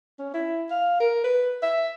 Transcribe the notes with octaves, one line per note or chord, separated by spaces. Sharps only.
C#4
E4
F5
A#4
B4
E5